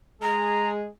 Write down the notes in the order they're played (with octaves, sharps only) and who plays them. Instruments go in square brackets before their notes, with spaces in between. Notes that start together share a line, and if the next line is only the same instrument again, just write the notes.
[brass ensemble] G#3 G#4 [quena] A#5